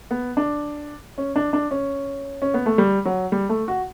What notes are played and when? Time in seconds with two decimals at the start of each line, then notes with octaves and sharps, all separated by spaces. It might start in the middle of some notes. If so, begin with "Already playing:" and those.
0.11 B3
0.37 D4
1.18 C#4
1.36 D4
1.53 D4
1.71 C#4
2.42 C#4
2.54 B3
2.66 A3
2.78 G3
3.05 F#3
3.32 G3
3.49 A3
3.68 F#4